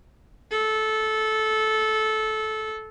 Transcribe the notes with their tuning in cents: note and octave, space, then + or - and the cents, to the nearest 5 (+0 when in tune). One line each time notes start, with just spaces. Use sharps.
A4 -15